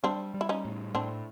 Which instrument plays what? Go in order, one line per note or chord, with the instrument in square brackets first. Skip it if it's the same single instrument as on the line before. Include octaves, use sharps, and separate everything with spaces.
[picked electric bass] G3 [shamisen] C4 D4
[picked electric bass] G3
[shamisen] E4
C#4 D#4
[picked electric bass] A2
[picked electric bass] A2 [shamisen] C4 D4